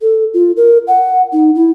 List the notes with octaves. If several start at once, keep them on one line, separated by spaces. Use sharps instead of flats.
A4
F4
A#4
F#5
D#4
E4